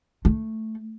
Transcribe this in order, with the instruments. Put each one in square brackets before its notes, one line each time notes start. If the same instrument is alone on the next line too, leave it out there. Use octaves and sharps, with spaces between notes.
[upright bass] A3